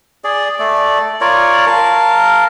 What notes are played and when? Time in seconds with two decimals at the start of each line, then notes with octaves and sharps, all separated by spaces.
0.24 G#4 D5
0.59 A3 D5
1.21 F4 A#4 C#5 D5
1.67 A#4 F5 A5